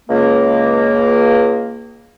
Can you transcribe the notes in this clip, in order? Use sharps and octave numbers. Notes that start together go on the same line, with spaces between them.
C#2 A#3